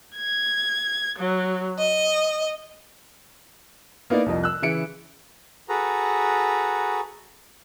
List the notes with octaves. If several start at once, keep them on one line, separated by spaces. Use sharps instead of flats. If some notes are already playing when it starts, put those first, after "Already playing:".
G#6
F#3
D#5
A#3 B3 D#4 E4 D5
C2 F2 D#5
E6 F#6
C#3 E3 E4 C#7 D7
F#4 G#4 A4 B4 A#5